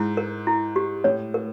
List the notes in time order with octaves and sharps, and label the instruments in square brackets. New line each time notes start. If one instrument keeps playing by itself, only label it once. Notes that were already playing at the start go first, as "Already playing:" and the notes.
Already playing: [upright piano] G#2 [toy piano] E4
[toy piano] A#4
E4
G4
[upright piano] A2 [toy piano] C#5
[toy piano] A#4